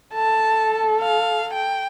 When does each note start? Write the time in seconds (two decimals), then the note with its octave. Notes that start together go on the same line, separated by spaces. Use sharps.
0.14 A4 A5
1.01 F5
1.54 G5